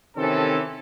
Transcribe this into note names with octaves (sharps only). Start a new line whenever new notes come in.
C3 D#3 E3 C4 C#4 A4